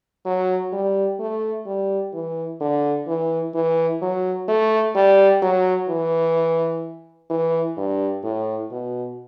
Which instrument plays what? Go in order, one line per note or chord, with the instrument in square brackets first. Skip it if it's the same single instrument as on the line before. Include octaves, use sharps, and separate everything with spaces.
[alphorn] F#3
G3
A3
G3
E3
D3
E3
E3
F#3
A3
G3
F#3
E3
E3
G2
A2
B2